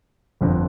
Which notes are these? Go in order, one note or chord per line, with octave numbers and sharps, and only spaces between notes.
G1 F2 D3